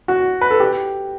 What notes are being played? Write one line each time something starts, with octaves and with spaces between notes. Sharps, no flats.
F#4
B4
A4
G4